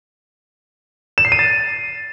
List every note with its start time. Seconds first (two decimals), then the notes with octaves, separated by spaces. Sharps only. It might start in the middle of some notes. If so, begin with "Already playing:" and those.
1.18 E7
1.25 C7
1.32 D#7
1.39 A6